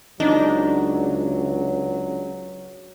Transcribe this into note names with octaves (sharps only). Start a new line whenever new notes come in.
C#2 F#3 D4 D#4